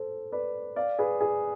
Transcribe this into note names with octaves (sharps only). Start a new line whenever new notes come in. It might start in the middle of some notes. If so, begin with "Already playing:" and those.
Already playing: A4 C5
B4 D5
D5 F5
G#4 B4
G#4